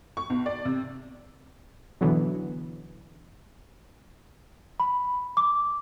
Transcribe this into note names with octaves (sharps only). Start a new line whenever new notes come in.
C#6
B1
D5
C3
B2 D3 E3 F#3 B3
B5
D6